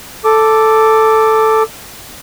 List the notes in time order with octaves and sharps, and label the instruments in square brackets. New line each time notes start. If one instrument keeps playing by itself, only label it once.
[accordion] A4 D6